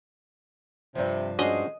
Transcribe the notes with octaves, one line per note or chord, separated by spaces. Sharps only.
G2 C3 F3
G#3 C#4 D4 F#4 G#4 C5 D#5